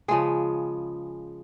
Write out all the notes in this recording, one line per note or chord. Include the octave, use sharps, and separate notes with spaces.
C#3 F3 G#3 G#4